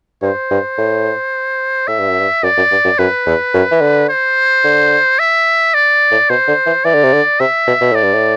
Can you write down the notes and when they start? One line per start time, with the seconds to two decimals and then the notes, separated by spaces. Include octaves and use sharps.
0.22 G2 C5
0.51 G2
0.78 A2
1.87 A2 E5
1.99 G2
2.09 F#2
2.20 G2
2.43 F#2 D5
2.57 F#2
2.71 G2
2.84 F#2
2.98 F#2 B4
3.26 E2
3.54 F#2
3.71 E3
3.81 D3
4.09 C5
4.64 D3
5.19 E5
5.74 D5
6.11 A2
6.30 B2 C5
6.48 D3
6.66 E3
6.85 E3 D5
6.94 D3
7.04 C3
7.13 D3
7.40 C3 E5
7.67 B2
7.81 B2
7.92 A2 D5
8.03 G2
8.14 A2